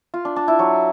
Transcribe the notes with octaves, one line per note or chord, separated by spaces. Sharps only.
F4
D4
D4
E4
F#3